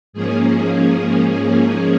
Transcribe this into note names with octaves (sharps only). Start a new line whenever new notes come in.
G#2 F3 A#3 C#4 G#4